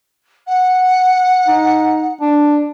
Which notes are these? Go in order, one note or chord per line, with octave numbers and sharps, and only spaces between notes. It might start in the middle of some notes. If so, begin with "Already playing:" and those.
F#5
D#4
D4